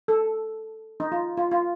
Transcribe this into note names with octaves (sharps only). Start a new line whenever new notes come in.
A4
D#4
F4
F4
F4